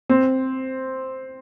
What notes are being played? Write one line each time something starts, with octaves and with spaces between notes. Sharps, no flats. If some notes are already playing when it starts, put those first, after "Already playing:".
C4